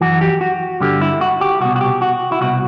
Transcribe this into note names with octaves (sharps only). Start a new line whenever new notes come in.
F#2 E3 F#4
G4
F#4
G2 D3 G4
E4
F#4
G4
C2 B2 F#4
F#4
G4
F#4
E4
C2 B2 F#4